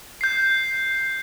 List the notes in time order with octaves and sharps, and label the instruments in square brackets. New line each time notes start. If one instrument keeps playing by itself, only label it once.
[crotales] G6 C7